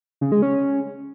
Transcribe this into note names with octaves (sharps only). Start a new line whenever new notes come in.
C#3
G#3
C#4